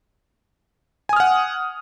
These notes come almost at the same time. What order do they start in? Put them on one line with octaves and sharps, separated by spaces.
G#5 D#6 F6 F#5